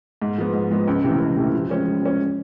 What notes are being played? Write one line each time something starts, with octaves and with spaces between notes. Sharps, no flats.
G#2
F3 G#3 B3
G#2
F3 G#3 B3
C#2
C3 E3 A3
C#2
C3 E3 A3
F3
G#3 C#4
F3
G#3 C#4